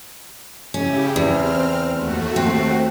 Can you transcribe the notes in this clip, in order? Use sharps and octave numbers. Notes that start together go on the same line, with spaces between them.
C#3 C#4 E4 G4
E2 C4 F6
D#2 A3 F#4
C4